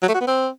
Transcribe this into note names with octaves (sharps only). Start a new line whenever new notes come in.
F#3
A3
F#4
B3
C4